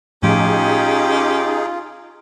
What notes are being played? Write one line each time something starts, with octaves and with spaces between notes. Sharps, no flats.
A2 F3 C#4 D#4 F4 G4 G#4